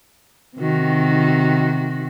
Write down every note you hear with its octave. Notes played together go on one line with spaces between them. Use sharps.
C3 D#3 F#4